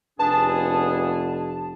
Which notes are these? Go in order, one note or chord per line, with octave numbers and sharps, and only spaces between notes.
F1 B3 D4 G#4 A5